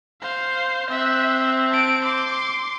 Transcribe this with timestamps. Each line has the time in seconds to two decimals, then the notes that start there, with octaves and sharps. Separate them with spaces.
0.21 C5 F5
0.90 C4 E5 F#6
1.71 A5 D7
2.04 C6 D6